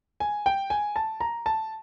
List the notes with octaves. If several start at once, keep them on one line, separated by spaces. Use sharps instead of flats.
G#5
G5
G#5
A5
A#5
A5